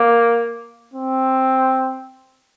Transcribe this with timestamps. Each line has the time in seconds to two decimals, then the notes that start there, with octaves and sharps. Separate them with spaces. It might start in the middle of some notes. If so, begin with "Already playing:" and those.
Already playing: A#3
0.94 C4